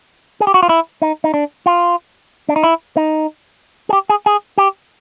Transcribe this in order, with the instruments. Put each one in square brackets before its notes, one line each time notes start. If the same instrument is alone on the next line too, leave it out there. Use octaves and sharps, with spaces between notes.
[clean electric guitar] G#4
G4
F#4
F4
E4
D#4
D#4
D4
F4
D4
D#4
E4
D#4
G#4
G4
G#4
G#4
G4